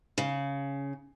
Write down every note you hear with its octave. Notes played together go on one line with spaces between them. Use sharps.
C#3